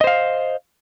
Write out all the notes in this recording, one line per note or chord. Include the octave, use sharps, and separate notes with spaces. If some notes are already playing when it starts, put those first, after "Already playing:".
C5 D#5 F5